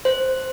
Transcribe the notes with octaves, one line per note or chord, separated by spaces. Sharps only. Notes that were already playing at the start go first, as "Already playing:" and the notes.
C5